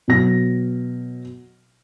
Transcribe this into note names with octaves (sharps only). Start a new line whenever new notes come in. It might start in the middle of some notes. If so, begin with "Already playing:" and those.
B2 F#3 A#6